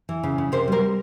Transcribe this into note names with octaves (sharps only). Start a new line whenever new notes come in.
E3
C#3
C#3
C3 A#4 C5
G3 A#4 C5